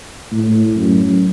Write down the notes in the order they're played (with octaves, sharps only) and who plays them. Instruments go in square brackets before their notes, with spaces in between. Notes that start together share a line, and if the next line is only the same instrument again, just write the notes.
[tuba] A2
F#2